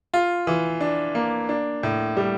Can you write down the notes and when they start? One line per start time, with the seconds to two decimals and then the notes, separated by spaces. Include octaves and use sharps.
0.14 F4
0.47 E3
0.81 D4
1.15 A#3
1.49 D4
1.83 A2
2.17 G3